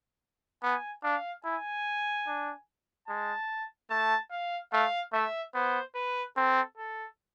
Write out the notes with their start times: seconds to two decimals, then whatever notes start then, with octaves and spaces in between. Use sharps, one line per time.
0.63 B3 G#5
1.04 D4 F5
1.44 E4 G#5
2.27 D4
3.08 G#3 A5
3.90 A3 A5
4.31 F5
4.73 A3 F5
5.13 A3 E5
5.54 B3 C5
5.95 B4
6.36 C4 A4
6.78 A4